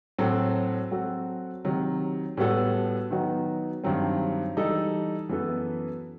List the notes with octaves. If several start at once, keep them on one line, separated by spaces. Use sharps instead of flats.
A2 F#3 C4 F#4 A4
F#3 C4 F#4 A4
C3 D#3 F#3
A2 G3 B3 F#4 A4
D#3 F#3 B3 D#4 F#4
G2 D#3 F#3 C4
E3 G3 D#4 A4
F#2 E3 B3 F#4 A4